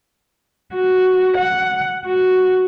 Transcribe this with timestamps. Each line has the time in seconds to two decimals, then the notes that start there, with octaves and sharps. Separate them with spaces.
0.74 F#4
1.37 F#5
2.06 F#4